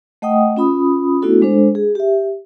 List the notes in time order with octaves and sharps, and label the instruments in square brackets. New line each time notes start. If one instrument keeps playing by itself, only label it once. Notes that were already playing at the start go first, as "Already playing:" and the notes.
[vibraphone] A3 D#5 F#5 G5 D#6
C#4 F4 B5 D#6
A3 B3 D4 E4 F#4 A4
G#3 D4 A4 C5
G#4
G4 E5